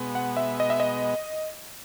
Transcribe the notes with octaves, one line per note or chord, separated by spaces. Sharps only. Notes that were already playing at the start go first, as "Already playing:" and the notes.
Already playing: B2 G#3 B3
F#5
E5
D#5
E5
D#5